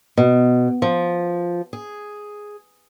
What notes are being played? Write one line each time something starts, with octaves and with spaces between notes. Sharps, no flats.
B2
F3
G#4